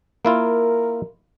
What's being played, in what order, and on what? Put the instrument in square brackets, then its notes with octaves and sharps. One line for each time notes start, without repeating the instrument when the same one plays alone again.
[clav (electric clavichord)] A#3 E4 F4 [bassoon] A#4